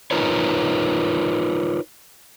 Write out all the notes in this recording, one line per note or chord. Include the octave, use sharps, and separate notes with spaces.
D#4 F4 A#4 B4 C#5